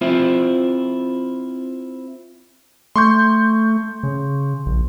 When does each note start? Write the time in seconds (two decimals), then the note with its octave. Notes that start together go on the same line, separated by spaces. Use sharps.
0.01 C4 E4 F4 C5 E5
2.96 A3 C6 C#6 G6
4.03 C#3
4.66 A#1